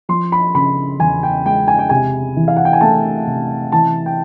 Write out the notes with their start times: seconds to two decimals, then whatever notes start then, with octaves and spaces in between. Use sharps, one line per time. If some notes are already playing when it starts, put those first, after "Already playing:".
0.09 F3 C6
0.32 B5
0.55 C#3 B5
1.00 E2 G#5
1.23 G5
1.45 G#3 G5
1.68 G#5
1.79 G5
1.89 C3 G#5
2.37 E3
2.48 F5
2.56 F#5
2.65 G5
2.73 G#5
2.81 A3 A5
3.27 C3
3.72 E3 A5
4.06 G5